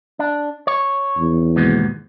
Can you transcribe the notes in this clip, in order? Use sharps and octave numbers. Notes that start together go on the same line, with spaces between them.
D4
C#5
E2
D#2 G#2 B2